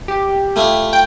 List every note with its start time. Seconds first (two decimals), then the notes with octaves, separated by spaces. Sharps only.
0.08 G4
0.56 A3 E4 F4
0.93 G5